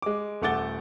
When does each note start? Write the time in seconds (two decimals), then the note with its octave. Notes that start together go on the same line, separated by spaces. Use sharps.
0.02 G#3 D6
0.42 D#1 A3 F#5 D6 A6 G7